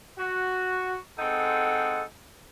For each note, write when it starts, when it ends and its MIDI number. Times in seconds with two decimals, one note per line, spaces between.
0.18 0.97 66
1.19 2.03 56
1.19 2.03 60
1.19 2.03 63
1.19 2.03 69
1.19 2.03 78